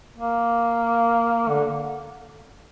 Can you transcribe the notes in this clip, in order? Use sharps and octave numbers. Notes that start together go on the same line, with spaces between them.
A#3
D3